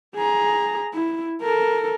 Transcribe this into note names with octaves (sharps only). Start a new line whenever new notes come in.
G#4 A#5
E4
A4 A#4